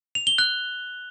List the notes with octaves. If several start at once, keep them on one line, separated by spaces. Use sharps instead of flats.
F7
G7
F#6